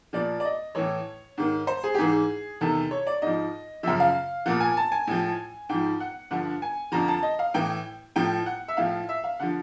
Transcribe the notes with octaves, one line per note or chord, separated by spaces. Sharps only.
A#2 F3 D5
D5
D#5
A2 E3 C#5
G#2 D#3
C5
G#4
G4
G#2 E3 G#4
E2 C3 D#3 A4
C#5
D5
G#2 F3 D#5
F#2 C#3 F3 E5
F5
A#2 F3 F#5
G#5
A5
G#5
A2 F3
G#2 F3 G5
F#5
G2 D3 F3 F#5
G#5
F2 D3 F3 A#5
A5
D#5
F5
A2 E3 G5
A2 F3 G5
F#5
E5
A2 F3 F5
E5
F5
D3 F3 F#5